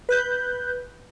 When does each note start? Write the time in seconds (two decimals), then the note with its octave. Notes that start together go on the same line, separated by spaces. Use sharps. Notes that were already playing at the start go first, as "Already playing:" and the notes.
0.09 B4 F#6 G6